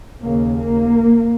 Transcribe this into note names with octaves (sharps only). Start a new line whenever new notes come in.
D#2 C#3 A#3
A#3